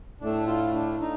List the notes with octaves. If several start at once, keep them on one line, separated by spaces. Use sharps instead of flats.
A2 A3 D4
F4
D4
D#4